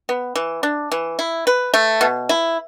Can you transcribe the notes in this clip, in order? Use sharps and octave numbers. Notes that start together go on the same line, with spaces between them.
B3
E3
D4
E3
E4
B4
A3
B2
E4